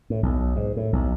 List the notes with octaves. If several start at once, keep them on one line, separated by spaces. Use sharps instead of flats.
A2
B1
G#2
A2
B1